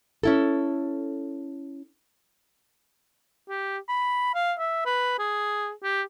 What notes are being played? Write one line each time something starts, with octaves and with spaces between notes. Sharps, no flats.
C#4 E4 A4
G4
B5
F5
E5
B4
G#4
G4